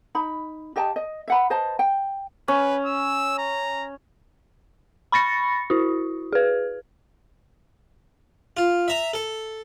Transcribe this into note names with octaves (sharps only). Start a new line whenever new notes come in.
D#4 B5
G4 D#5 G5 A5
D#5
E5 F#5 B5
B4 C5 D#5 A5
G5
C#4 B4
E6
A#5
B5 C#6 A6 A#6 C#7
E4 F#4
G#4 B4
F4
E5 A#5
A4